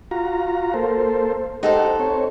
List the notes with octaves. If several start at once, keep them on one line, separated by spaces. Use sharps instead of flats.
F4 F#4 A#5
A#3 A4 C5
D#4 G4 A4 C5 F#5
C4 C#5